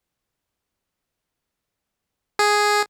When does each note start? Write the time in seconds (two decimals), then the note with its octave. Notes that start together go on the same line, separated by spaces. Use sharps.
2.39 G#4